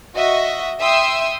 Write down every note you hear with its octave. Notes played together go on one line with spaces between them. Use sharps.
F#4 D#5 E5
E5 G5 C6 D#6 E6